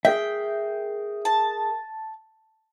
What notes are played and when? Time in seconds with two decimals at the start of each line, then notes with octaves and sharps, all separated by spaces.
0.05 G#4 A#4 E5 G5
1.25 A5